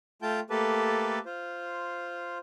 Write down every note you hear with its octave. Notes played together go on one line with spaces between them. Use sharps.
A3 F4 G5 A5 G6
A3 A#3 G4 A4 B4 A5
F4 C5